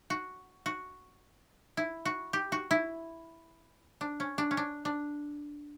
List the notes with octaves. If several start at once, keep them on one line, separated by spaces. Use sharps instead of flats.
F#4
F#4
E4
F#4
G4
F#4
E4
D4
C#4
D4
C#4
D4
D4